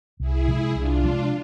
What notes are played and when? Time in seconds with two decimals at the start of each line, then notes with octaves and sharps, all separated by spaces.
0.20 C2 E4 G#4
0.48 C3 F3 G#3
0.74 C2 D4 F4
1.03 C3 F3 G#3